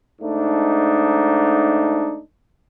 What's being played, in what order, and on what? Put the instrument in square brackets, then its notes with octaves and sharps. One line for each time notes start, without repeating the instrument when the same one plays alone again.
[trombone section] G#2 A3 D4 D#4